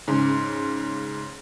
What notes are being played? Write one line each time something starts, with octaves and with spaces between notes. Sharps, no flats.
G#2 C#3